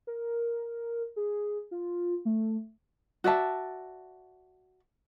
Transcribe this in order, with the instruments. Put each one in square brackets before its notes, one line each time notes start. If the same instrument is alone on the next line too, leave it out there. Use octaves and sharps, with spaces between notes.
[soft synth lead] A#4
G#4
F4
A3
[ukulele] F#4 D5 E5 A5